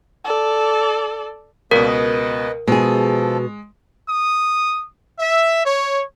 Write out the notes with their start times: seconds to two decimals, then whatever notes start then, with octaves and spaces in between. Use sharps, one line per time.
0.24 A4 D5
1.71 C#2 B2 A#3 A#4 B4 D5
1.87 B4 D#5
2.68 B2 F3 G#3 G#4 A4
4.09 D#6
5.18 E5
5.66 C#5